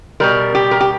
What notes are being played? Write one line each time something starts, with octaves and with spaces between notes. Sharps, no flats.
B2 G3 A#4
G4
A#4
G4